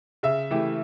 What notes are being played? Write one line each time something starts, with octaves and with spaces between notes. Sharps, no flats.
C#3 E5
E3 A3 E4 G4